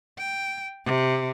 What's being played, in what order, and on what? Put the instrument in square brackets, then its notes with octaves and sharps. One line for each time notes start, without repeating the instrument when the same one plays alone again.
[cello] G5
C3